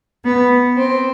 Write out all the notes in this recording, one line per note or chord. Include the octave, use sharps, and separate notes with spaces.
B3
C4